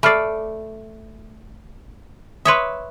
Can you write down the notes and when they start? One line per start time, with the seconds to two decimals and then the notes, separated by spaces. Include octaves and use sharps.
0.03 A3 D5 B5 F6 C7
2.45 B4 C#5 E5 C6 D#6